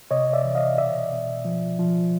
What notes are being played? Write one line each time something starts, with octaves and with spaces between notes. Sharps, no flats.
C3 C#5 D#5
D5 E5
E3
D#5 F5
B2 D5 E5
B2
F3
F3